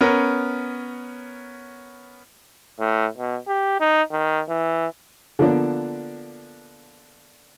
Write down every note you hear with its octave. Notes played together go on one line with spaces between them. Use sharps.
B3 C#4 A#4
A2
B2
G4
D#4
D#3
E3
D3 F3 A#3 B3 D4